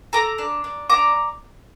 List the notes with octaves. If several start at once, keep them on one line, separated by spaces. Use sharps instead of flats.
A4 A#5 D6
D4
D4
D4 A#5 D6